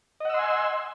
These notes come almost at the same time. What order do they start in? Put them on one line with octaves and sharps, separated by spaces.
D#5 F#5 E6 C6 G#5